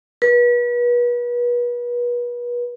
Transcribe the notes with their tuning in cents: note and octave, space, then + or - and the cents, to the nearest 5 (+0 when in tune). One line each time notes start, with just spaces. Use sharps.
B4 -35